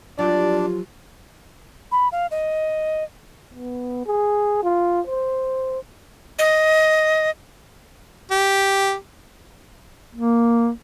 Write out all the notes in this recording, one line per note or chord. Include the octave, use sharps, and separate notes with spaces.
F3 F#3 D4 F4 G4 D5
B5
F5
D#5
B3
G#4
F4
C5
D#5
G4
A#3